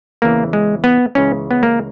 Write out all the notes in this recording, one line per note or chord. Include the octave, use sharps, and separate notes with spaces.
E2 C#3 E3 A#3
G#3
B3
C#2 C#3 E3 C#4
B3
A#3